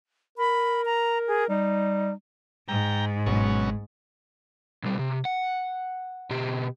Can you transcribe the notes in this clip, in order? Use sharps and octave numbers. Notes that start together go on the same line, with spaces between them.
A#4 B5
A#5
G#4
G3 D#4
G#2 G5 A#5
G#1 B2 F#3 C#4
B1 G3
C3
F#5
B2 G4